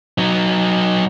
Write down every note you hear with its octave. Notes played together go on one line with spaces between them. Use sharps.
F#3 D#4